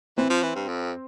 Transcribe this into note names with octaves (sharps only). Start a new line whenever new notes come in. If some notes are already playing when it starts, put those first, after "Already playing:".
E3 C4
F3
E3
G2
F2